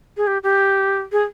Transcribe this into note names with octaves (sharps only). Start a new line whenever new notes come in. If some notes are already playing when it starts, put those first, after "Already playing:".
G#4
G4
G4
G#4